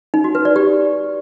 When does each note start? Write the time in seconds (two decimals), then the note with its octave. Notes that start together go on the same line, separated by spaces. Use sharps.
0.14 D#4
0.24 F#4
0.35 B4
0.45 D5
0.56 G4